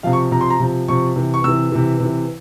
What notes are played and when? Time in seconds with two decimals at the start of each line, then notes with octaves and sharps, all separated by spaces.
0.03 C3 F3 F5
0.13 C#6
0.31 C3 F3 A#5
0.41 C6
0.50 A#5
0.60 C3 F3
0.88 C3 F3 C#6
1.16 C3 E3
1.34 C#6
1.44 C3 E3 E6
1.72 C3 E3
2.00 C3 E3